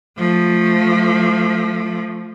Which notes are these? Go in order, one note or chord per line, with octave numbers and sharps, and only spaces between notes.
F3 A3